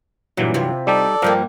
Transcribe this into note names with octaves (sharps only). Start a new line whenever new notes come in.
G2 A#2 E3 F#3
C3 E4 F4
G3 D#4 G4 A4 D5
G2 F3 G3 A#3 A#4